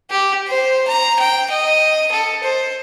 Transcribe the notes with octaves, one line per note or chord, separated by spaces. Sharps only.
G4
C5
A#5
G5
D#5
A4
C5